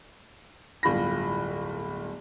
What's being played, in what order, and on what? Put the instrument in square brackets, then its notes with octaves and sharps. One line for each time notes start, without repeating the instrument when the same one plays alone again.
[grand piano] D1 G1 F4 B5 A#6